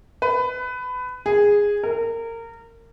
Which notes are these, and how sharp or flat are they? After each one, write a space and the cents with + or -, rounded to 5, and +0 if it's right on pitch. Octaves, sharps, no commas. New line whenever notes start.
B4 +20
G#4 -10
A#4 -25